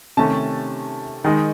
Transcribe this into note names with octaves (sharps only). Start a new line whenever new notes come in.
C3 D#3 A3 C#4 A5
D#3 G#3 D#4